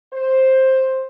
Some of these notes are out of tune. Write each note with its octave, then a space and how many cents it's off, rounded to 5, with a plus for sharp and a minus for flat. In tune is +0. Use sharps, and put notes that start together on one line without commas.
C5 +10